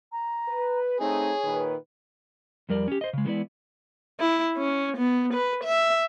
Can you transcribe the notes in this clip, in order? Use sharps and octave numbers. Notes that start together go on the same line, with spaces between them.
A#5
B4
A3 C4 D#4 G#4 C#5
A#2 D#3 B4
F2 G3 A#4 D5
C#4 G4
C5 D#5
C#3 G#3
E3 G3 G#3 B3 E4 D5
E4
C#4
B3
B4
E5